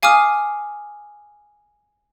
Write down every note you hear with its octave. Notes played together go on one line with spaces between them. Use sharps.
F5 G#5 D6 D#6 F6